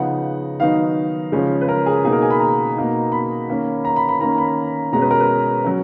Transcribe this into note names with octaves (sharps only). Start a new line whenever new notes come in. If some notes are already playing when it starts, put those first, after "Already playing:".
Already playing: C#3 F3 B3 D#4 F#5
D#3 F#3 B3 D#4 F5
C#3 F3 G#3 C#4
B4
A#4
G#4
B2 A#3 D#4 G#4
A#4
G#5
B5
A#5
B2 A#3 D#4
B5
D#3 A#3 C#4
A#5
B5
B5
D#3 A#3 C#4 A#5
B5
B2 G#3 C#4 A#5
B4
A#4
B4
F#3 C#4